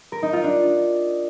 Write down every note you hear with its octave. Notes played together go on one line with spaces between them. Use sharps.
A#4
D#4
F4
D4